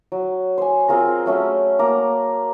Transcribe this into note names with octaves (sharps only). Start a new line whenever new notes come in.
F#3
C5 G#5
C4 F4 G#4 A#4
F#3 A3 C#4
A#3 A#5 D6